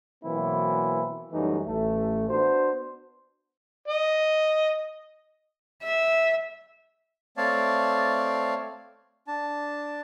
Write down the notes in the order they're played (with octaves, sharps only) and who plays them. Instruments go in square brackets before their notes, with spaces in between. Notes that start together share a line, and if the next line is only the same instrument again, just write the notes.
[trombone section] B2 E3 F#3 A#3 C4 E4
F#2 E3 G3 A3 D#4
A1 A3
B3 D4 F#4 C5
[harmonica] D#5
[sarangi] E5
[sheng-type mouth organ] A3 C4 C#5 D5 F5 A5
D4 A5